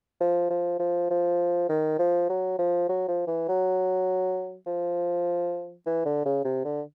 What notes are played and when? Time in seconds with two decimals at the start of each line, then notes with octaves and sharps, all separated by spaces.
0.20 F3
0.50 F3
0.79 F3
1.10 F3
1.69 D#3
1.99 F3
2.29 F#3
2.58 F3
2.89 F#3
3.08 F3
3.27 E3
3.48 F#3
4.66 F3
5.86 E3
6.05 D3
6.25 C#3
6.44 C3
6.64 D3